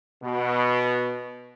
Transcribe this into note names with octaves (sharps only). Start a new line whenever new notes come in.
B2